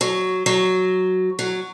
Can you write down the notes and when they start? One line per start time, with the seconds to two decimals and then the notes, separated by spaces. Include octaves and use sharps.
0.01 F#3
0.46 F#3
1.39 F#3